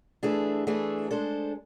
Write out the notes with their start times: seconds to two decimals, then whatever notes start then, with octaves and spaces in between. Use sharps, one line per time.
0.23 E3 A3 D4 G#4
0.67 E3 A3 D4 G#4
1.11 G#3 D4 A4 C5